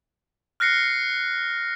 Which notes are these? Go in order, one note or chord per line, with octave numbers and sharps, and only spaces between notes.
F6 F#6 A#6 C7 C#7